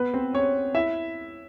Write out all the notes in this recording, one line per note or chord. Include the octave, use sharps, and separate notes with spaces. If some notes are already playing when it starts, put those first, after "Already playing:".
Already playing: B3 B4
C4 C5
C#4 C#5
E4 E5